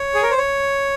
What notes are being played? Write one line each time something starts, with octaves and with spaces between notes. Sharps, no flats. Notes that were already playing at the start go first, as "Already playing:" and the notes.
Already playing: C#5
G#4
A#4
C5
C#5